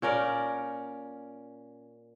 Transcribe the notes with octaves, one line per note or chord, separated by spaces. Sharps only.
A#2 C#4 A#4 D5